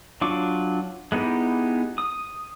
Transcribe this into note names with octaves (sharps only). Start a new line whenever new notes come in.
F#3 D4 F4 C#6 D6
G#3 B3 D#4 E4 G4
D#6